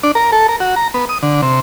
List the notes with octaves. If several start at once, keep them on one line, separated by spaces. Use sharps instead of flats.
D4
A#4
A4
A#4
F#4
A#5
B3
D#6
D3
C3